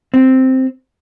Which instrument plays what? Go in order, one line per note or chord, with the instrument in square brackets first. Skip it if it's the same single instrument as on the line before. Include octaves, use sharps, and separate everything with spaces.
[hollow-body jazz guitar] C4